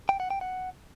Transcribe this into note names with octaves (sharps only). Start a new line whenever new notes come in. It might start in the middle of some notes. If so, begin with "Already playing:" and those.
G5
F#5
G5
F#5